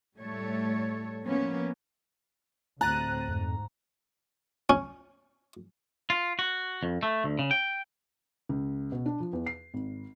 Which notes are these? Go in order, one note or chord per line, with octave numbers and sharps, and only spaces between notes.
A2 G3 A3 A4 C#5
F3 A#3 B3 C#4
D2 A2 C4 A#5 F#6 A6 D#7
F2 G#2
C#4
F4
F#4
F2
A3
D2
C#3
G5
C#2
B2
D4
F3
E2
C7
G#1